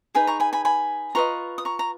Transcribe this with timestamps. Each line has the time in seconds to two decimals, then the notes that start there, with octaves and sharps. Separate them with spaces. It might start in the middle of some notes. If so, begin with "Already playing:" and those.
0.15 D#4 G#4 B4 G#5 B5
0.27 A#5 C#6
0.40 G#5 B5
0.53 G#5 B5
0.65 G#5 B5
1.15 F4 B4 D#5 A#5 C#6
1.58 D#6
1.65 A#5 C#6
1.79 A#5